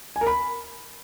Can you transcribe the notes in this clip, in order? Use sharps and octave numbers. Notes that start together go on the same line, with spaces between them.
G#5
A#4
B5